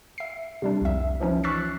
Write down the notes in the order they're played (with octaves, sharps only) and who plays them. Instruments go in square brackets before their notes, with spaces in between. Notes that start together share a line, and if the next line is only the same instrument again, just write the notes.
[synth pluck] E5 C7
C3 G3 D4
C2 F2 E5
E3 F3 C#4 D#4
C#6 E6 F#6 A6 B6 C7